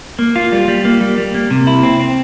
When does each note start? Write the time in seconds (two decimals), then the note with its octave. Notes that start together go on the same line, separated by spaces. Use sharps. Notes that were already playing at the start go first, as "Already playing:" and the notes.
0.19 A#3
0.36 F4
0.52 G3
0.68 G3
0.85 A#3
1.01 G3
1.18 G3
1.35 A#3
1.51 C3
1.67 E4
1.83 C4
2.00 C4